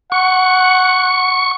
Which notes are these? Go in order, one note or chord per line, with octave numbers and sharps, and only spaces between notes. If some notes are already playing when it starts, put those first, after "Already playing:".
F#5 C#6